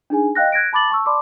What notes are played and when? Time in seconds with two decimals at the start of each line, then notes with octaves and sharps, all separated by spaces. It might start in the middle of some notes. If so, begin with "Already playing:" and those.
0.10 D4 D#4 G#4 G#5
0.35 D#5 F5 G5 F#6 A#6
0.52 F#6 G#6 A#6 D7
0.73 A5 B5 D6 A6 F#7
0.90 A5 C#6 E6
1.06 D5 A5 B5 C6 D6